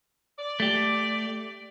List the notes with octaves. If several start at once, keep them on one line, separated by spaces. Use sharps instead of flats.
D5
A3 G4